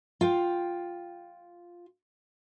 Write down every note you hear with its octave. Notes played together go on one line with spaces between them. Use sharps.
F4 G5